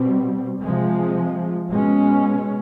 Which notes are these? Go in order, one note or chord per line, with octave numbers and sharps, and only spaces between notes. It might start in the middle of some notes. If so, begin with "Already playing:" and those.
Already playing: B2 G3 C4
C3 F3 G#3
B2 G#3 C#4